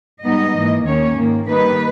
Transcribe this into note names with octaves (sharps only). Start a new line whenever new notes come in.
G#2 G3 B3 D#4 D#5
G#2 E3 A#3
D#2 D#3 A#3 C#4 C#5
G#2 D#3 A#3
D#3 G3 A#3 D#4 B4